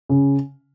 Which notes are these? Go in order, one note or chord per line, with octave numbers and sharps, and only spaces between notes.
C#3